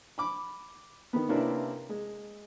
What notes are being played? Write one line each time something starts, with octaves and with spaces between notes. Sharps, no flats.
B5 D6
D#3 B3
C3 A#3 C#4 D4 E4 B4
G#3